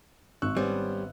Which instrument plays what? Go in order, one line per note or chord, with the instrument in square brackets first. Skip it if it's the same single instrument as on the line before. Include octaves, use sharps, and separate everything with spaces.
[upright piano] G#1 [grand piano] C#6 E6 F#6
[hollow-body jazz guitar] G3 [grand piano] B3 C#4 C5